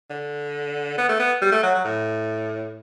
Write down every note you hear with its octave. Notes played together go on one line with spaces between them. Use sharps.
D3
B3
A3
B3
G3
A3
F#3
F#3
A2